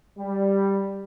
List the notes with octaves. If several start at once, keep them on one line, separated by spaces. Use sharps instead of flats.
G3